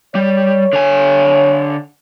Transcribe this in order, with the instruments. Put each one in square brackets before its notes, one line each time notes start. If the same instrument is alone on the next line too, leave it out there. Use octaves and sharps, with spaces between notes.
[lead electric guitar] G3 [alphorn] C#5
[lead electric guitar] D3 G#5